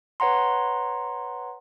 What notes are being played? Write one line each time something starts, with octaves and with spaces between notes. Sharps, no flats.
B4 C#5 F#5 A#5 C6